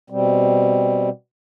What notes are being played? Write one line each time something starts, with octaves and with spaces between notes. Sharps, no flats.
B2 G3 C4